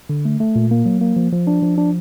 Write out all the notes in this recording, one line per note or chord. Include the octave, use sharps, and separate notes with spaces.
D3
A3
A3
A#2
A#3
F#3
A#3
F3
F3
D4
F3
D4